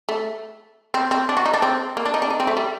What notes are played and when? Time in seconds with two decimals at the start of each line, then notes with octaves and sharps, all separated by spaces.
0.09 A3
0.94 C4
1.11 C4
1.29 D4
1.37 F#4
1.46 D#4
1.54 D4
1.62 C4
1.97 A#3
2.05 D4
2.14 D#4
2.22 D4
2.30 D#4
2.40 C4
2.47 A3
2.57 G3